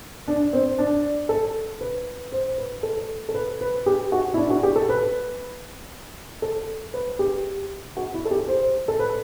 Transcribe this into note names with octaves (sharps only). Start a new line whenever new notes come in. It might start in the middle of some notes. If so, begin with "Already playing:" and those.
D4
C4
D4
A4
B4
C5
B4
A4
A4
B4
B4
G4
F#4
E4
D4
F#4
G4
A4
B4
A4
B4
G4
F#4
E4
A4
G4
C5
A4
B4